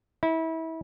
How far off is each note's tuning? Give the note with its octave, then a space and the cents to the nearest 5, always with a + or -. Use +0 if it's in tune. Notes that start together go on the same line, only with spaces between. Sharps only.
E4 -30